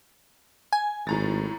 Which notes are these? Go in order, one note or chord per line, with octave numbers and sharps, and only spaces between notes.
G#5
G#1 A2 A#5 A6